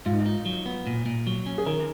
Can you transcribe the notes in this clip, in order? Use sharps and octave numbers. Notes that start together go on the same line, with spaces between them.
G#2 F4
D#4
F4
D#4
F#3
B3
A#2
A#2
F#3
C#4
G#4
D#3 A#4